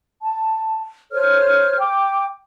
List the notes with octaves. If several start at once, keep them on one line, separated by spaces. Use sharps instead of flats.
A5
A4 C5 C#5 F6
G5 D6